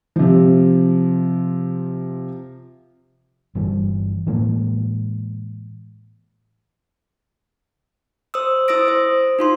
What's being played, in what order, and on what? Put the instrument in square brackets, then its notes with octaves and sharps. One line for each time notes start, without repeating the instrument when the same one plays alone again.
[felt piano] C3 F3
[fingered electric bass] G1 E3 G3
A2 E3 G#3 A#3
[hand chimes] C5 D#6 E6
E4 C5 D#6 E6 A#6 D7
C5
D#4 F4 C6